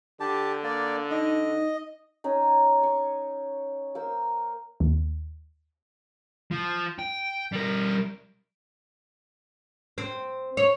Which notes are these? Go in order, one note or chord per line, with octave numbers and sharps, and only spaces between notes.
D3 G4 A5
A#3 D5
D#4 D#5
C#4 D#4
C#6
A#3 C5 E6
D#2
F3
G5
G3 A#4
C4
C#5